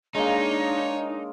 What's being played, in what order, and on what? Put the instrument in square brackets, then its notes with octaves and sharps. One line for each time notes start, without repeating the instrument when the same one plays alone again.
[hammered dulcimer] G#3 A#3 [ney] D4 [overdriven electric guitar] D#4 [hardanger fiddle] C#5